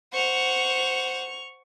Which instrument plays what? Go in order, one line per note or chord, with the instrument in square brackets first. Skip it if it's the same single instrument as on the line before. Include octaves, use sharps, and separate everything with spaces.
[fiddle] C5 F#5 [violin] C#6 F7